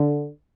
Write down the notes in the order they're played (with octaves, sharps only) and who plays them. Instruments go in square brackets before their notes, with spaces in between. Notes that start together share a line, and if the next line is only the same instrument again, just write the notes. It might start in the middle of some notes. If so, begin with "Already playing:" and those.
Already playing: [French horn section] D3